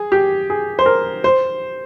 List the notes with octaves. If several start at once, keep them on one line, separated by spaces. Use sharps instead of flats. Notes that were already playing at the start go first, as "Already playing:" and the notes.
Already playing: G#4
G4
G#4
C5
A#4
C5